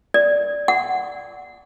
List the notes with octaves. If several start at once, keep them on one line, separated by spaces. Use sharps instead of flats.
D5
F#5